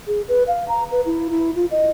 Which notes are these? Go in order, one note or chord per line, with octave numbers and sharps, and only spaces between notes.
G#4
B4
F5
A#5
B4
E4
E4
F4
D#5